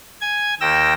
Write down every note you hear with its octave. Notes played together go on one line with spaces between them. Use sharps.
G#5 G#6
D#2 G5 E6 A#6